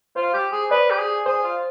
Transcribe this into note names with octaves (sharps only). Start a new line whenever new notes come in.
F4 C5
G4
G#4
B4 D5
G4
G#4
G#4 C5
F4